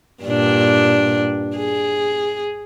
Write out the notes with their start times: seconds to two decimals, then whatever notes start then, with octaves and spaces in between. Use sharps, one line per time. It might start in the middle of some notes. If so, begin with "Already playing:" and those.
0.23 G2 A#2 D4
1.57 G#4